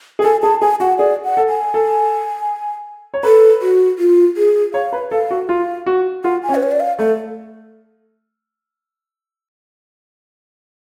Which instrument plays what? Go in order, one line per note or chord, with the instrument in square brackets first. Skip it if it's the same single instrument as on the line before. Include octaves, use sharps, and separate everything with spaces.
[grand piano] G#4
[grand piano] A4 [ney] G#5
[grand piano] G#4 [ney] A5
[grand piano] G#4 [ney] G#5
[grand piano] F#4 [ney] F#5
[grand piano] G#4 [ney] D5
[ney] F#5
[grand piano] A4
[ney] G#5
[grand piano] A4
C#5
[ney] A4 [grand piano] B4
[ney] F#4
F4
G#4
[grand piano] C#5 [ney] F5
[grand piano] B4
[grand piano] A4 [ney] F5
[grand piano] F#4
[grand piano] F4 [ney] F5
[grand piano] F#4
[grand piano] F4 [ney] F#5
[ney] G#5
[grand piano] C#4
[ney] B4
C#5
D5
F5
[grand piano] A3 [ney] A4